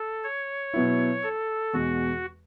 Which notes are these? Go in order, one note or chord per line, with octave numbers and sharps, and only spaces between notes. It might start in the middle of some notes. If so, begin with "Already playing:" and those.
Already playing: A4
C#5
B2 F#3 B3 E4
A4
E2 B2 G#3 F#4